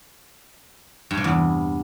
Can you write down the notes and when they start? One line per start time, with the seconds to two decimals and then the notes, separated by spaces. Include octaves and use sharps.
1.11 G2
1.17 C3
1.24 E2